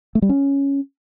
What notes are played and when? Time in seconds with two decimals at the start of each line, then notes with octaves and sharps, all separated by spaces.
0.15 A3
0.22 G3
0.29 C#4